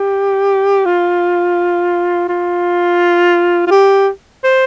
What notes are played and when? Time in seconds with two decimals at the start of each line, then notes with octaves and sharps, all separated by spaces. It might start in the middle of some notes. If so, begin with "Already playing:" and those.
Already playing: G4
0.85 F4
2.29 F4
3.67 F4
3.71 G4
4.44 C5